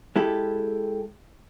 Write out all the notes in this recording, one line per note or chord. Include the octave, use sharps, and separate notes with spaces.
G#3 E4 G4 A4